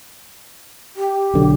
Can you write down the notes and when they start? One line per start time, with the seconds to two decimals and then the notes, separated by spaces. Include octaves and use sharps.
0.96 G4
1.34 B1 D3 F#3